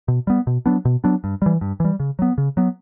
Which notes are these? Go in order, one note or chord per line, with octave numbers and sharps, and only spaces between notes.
B2
G3 B3
B2
F#3 B3 D4
B2
F#3 B3 D4
G2
E3 G3
G2
E3 G3
C#3
F#3 B3
C#3
F#3 B3